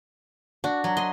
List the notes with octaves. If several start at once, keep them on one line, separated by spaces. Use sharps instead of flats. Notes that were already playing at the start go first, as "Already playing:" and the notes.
D4 F#4
F#3
D#5 C6